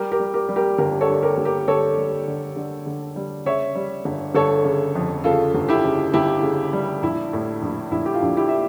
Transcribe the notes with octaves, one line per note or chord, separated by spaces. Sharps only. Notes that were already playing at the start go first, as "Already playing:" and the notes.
Already playing: G3 G4 A#4
G4 A#4
G3
G4 A#4
G3
G4 A#4
G1 G4 A#4
A4 C#5
G2
G4 A#4
G1
G4 A#4
G1 A4 C#5
G3
D3
D3
D3
G3
C#3 C#5 E5
G3
G1
G1 A4 C#5
C#3
F2
C#3 F4 A4
G1
E4 G4
C#3
G1 E4 G4
C#3
G3
A#1 E4
A2
A#1
A#1 E4
G4
F4
A#1
E4 G4
E5